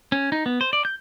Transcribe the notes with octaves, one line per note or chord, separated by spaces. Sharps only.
C#4
D#4
B3
C5
D5
G6